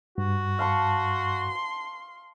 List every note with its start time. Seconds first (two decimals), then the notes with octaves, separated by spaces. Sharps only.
0.18 G2 F#4
0.59 F5 A5 C6 C#6